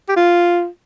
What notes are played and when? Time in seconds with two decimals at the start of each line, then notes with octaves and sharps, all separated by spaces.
0.09 G4
0.16 F4